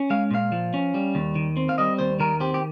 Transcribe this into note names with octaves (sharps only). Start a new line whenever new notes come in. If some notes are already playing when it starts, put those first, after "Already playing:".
Already playing: C#4
G#3 F5
A#2 F5
F3
C#4
G3
D#2
D#3
C4
F5
G3 D#5
D#2 C5
D#3 A#4
C4 G4
G4